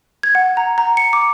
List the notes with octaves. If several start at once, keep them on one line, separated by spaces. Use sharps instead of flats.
G#6
F#5
A#5
A#5
C#7
D6